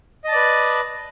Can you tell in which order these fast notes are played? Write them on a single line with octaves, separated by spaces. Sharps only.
D#5 A5 D5 B4